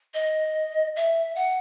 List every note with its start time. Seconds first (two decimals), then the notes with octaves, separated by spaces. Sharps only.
0.14 D#5
0.96 E5
1.36 F#5